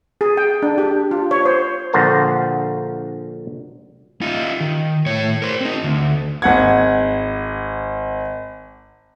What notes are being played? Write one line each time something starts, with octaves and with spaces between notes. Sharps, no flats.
G#4
G5
D4
G4
F4
C#5
C5
A#1 D3 F#4 A#4 C5 A5
D#4 F4
D#3
A2 C#5
A#4 C5
C4 D#4
D2
G#1 F#5 G#6